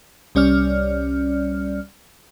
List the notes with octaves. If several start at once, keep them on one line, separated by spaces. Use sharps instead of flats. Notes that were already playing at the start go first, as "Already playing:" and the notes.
C2 G3 C#4 D5 F6